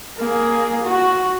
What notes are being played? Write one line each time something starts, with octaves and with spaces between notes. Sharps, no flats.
A#3 G#4
F#4